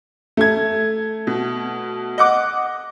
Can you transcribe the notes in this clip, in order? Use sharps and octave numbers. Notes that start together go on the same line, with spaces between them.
A3 G#6
B2
D#5 F#5 D6